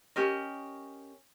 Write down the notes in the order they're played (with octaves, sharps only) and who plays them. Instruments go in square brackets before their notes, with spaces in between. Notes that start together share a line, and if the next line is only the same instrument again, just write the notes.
[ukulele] C#4 G4 A#4 D#5